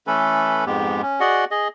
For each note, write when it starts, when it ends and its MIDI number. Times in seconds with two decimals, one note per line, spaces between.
0.07 0.65 52
0.07 0.65 57
0.07 0.65 61
0.07 0.65 69
0.07 0.65 71
0.66 1.02 41
0.66 1.02 44
0.66 1.02 56
0.66 1.02 59
0.66 1.02 67
1.02 1.20 61
1.20 1.45 66
1.20 1.45 68
1.20 1.45 74
1.20 1.45 75
1.20 1.45 78
1.51 1.68 68
1.51 1.68 75